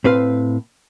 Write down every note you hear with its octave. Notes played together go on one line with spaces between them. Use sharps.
A2 C4 B4 F5